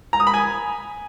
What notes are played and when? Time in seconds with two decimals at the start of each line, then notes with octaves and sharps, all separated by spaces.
0.13 A#5
0.20 D#6
0.27 B5
0.34 G#5